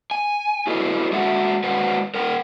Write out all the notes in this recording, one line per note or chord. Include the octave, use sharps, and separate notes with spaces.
G#5
E4 F#4 G#4 A4 B4 D#5
G#3 A3 F#4 E5 F#5
G#3 F#4 B4 C5 F#5
A#4 F#5 G5